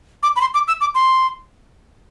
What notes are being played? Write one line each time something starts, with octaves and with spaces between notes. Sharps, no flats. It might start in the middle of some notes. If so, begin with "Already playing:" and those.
D6
B5
C6
D6
E6
D6
C6